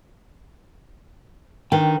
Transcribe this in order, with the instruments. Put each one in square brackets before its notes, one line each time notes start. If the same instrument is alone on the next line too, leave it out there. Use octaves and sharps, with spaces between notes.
[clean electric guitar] D3 B4 G5 [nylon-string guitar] D#3